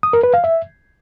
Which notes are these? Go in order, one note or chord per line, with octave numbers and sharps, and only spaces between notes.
D#6
A#4
B4
F5
E5